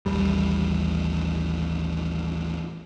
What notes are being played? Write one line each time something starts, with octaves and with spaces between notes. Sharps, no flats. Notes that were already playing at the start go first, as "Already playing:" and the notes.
A1 D#2 G3